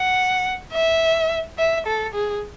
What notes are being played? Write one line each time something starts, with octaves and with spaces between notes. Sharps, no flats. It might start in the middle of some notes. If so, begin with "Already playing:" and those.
Already playing: F#5
E5
E5
A4
G#4